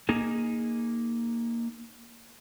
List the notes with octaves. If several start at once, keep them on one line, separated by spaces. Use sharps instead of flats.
A#3 D#4 G#4